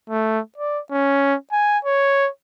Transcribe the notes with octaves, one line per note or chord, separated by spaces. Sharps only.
A3
D5
C#4
G#5
C#5